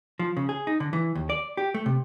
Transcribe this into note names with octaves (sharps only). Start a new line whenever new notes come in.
F3
C#3
G#4
D#4
D3
E3
D#2
D5
G4
A3
C3